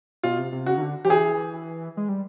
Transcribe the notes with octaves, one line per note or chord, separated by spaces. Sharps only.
B2 F4
C3
C3
C#3 F#4
D#3
D3
F3 G4
E3 G#4
G#3
G3